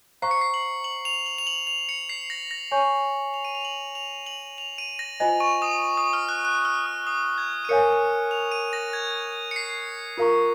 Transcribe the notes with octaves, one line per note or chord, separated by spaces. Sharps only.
C5 F5 A#5 C#6 C7
C#7
C7
F#7
F#7
F7
F#7
F7
F#7
F7
C#7
C7
A#6
A#6
C#5 G#5 C#6
F7
D#7
F7
F#7
F7
F#7
F7
D#7
A#6
F4 C5 D#5 G#5 A#6
C#6
D#6
D#6
F6
F#6
F#6
F6
D#6
D#6
G#6
D#7
A#4 C#5 F5 G#5 C#7
F7
D#7
A#6
G#6
C#7
C7
F4 A#4 F5 A#5 C#6